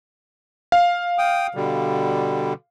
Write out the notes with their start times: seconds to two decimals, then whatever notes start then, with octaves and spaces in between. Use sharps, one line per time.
0.72 F5
1.18 G5 D#6
1.55 B2 D3 G3